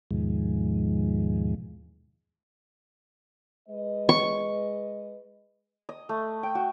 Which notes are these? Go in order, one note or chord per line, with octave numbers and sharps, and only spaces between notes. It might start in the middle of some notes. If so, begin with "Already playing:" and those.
D#2 G#2 B2 D#3 F3 G#3
G#3 B4 D#5
C#6
D#5
A3
G5
F#4